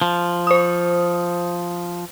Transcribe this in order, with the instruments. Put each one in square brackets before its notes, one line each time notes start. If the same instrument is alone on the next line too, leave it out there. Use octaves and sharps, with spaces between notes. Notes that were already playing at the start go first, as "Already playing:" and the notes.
[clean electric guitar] F3
[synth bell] C5 D#6